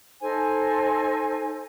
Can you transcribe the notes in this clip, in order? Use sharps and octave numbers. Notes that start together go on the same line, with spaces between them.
D#4 A4 C5 G#5